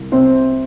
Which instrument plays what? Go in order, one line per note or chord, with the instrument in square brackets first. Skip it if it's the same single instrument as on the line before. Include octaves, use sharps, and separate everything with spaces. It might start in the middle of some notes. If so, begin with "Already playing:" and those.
Already playing: [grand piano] C2
C3 C4 C5